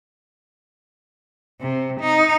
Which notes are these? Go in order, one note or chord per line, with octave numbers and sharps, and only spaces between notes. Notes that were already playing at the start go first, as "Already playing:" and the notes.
C3
D#4